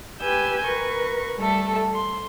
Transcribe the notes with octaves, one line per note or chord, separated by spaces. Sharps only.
G4 B4 G#5 E6 G6
A#4 B4 C#6
G3 A3 A4
C6